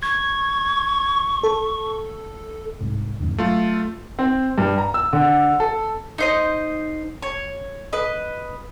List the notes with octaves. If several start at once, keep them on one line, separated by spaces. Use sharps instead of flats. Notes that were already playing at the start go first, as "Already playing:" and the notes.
C#6 G#6
A4
C2 G#2
F2 G#2 D3
F#3 A3 F4
C4
G2
A#5
E6
D3
A4
D#4 C5 D#5
C#5
B4 D#5